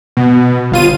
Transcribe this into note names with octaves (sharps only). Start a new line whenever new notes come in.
B2
G1 F4 D#7